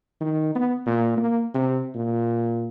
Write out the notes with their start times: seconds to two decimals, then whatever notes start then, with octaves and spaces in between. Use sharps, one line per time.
0.21 D#3
0.55 B3
0.86 A#2
1.17 A#3
1.54 C3
1.95 A#2